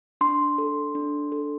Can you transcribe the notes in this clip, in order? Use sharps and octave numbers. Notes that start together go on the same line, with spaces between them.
D4 C6
A4
D4
A4